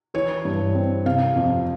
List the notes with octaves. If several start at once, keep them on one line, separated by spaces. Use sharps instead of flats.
E3 C#5
G2
C4
C3 F5
F2